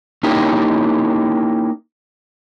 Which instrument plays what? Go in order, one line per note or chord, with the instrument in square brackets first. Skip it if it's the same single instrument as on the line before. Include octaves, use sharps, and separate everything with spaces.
[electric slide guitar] A#3 C#4 D#4 E4 G4